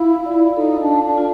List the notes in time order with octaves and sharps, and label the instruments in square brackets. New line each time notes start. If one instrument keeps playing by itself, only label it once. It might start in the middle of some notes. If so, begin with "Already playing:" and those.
Already playing: [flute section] E4 [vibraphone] F4 F5
[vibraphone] D5
[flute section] D#4 [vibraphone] A4
[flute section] D4
[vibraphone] F5
[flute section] D4
[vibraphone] F4